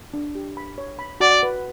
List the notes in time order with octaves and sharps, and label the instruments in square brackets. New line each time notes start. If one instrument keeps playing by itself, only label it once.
[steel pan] D4
G4
B5
C#5
B5
[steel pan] F#4 [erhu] D5
[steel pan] B4